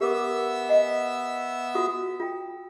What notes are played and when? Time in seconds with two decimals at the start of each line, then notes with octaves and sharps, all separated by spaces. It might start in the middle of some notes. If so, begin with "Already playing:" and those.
0.01 B3 G4 A#4 E5 D6 E6
0.69 D#5 F#5 G#5
1.75 F4 F#4 D#6
2.20 F4 G5